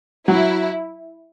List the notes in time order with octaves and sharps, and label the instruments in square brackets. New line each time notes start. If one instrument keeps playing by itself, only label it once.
[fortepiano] F#3 [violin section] E4